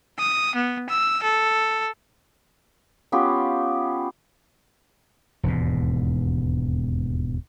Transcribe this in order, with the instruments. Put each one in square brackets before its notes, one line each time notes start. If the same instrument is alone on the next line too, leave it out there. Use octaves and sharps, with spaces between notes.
[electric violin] D#6
B3
E6
A4
[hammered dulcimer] B3 C#4 F4 G4
[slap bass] E1 D#2 G#2